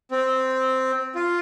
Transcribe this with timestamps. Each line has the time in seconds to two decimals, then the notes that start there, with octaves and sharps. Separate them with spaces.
0.11 C4
1.15 F4